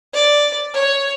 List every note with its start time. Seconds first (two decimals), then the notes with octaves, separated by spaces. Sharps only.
0.13 D5
0.74 C#5